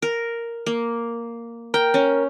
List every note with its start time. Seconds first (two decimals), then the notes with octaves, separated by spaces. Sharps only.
0.02 A#4
0.66 A#3
1.74 A#4 G5
1.94 C#4